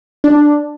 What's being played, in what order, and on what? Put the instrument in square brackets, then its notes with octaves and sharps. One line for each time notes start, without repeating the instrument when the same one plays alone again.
[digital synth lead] D4